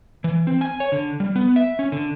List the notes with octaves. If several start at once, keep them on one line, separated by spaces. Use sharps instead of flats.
E3
C4
G#5
C#5
D3
G3
B3
E5
C#4
D3